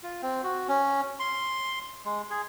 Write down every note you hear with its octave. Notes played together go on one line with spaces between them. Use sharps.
F4
C4
F#4
C#4
C6
G#3
G#4